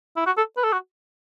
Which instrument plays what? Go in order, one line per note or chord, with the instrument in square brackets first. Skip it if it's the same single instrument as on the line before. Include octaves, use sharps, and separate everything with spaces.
[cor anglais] E4
F#4
A4
B4
A4
F#4